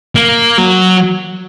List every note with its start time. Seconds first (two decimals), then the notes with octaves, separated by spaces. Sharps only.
0.15 A#3
0.58 F#3